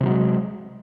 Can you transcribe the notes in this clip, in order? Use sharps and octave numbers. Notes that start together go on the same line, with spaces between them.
C3 F3 F#3 G#3